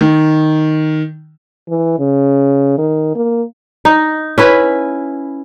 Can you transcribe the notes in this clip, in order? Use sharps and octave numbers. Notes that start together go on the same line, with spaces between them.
D#3
E3
C#3
D#3
A#3
D#4
C#4 E4 B4